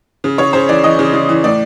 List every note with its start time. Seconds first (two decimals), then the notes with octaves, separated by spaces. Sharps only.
0.24 C#3
0.38 C#3 C#5
0.53 C#3 C5
0.69 E3 D5
0.84 E3 D#5
0.99 C#3
1.13 C#3
1.29 E3
1.44 A2 D5